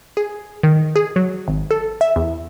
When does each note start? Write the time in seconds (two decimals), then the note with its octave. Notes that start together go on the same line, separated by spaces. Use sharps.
0.17 G#4
0.63 D#3
0.96 G#4
1.16 F#3
1.48 G#1
1.71 A4
2.01 E5
2.16 E2